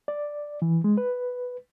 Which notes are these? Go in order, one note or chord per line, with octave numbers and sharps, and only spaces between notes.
D5
E3
G#3
B4